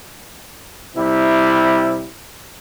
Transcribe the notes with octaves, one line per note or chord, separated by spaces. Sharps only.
C3 G3 E4